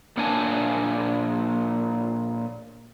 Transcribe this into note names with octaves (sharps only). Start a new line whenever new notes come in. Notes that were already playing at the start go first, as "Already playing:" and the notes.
A#2 A#3 D4 C#5 G#5 A5